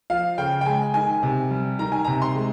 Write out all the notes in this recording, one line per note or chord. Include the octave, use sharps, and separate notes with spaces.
F3 F5
C#3 G5
G5
G#3 G#5
D#3 G#5
C3
G3
D#3 A#5
G#5
C3 A#5
C6
G#3